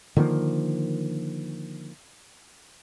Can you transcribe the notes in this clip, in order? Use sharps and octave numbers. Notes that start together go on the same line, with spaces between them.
D3 D#3 F3 A#3